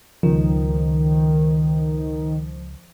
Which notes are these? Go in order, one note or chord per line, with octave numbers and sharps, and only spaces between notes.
C#2 D#3 F3